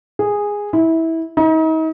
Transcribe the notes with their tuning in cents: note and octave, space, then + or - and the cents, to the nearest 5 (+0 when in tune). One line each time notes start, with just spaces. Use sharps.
G#4 -10
E4 -20
D#4 +40